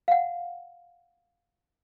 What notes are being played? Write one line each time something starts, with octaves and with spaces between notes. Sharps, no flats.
F5 F#5